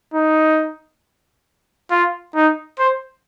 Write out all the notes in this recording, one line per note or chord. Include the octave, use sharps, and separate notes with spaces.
D#4
F4
D#4
C5